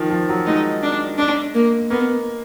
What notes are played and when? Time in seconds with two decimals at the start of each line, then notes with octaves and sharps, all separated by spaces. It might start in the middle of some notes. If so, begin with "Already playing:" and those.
Already playing: D#3 F3
0.10 F3
0.29 F#3
0.46 G#3 D#4
0.83 D4
1.18 D4
1.54 A#3
1.90 A#3 B3